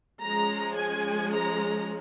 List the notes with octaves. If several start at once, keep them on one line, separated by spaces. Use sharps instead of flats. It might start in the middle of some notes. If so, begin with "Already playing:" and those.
F3 G#3 C#4 A#5
G#5
A#5